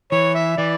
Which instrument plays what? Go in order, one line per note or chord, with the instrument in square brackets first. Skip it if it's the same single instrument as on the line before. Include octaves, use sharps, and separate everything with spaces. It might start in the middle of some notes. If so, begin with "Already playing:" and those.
[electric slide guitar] E3 [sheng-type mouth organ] C#5
[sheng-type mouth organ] E5
[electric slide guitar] E3 [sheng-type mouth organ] D5